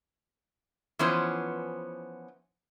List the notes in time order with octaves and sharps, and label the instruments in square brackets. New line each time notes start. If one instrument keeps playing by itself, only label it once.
[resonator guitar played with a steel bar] E3 F3 B3 C#4 C5